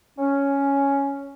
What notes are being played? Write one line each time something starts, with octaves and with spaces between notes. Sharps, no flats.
C#4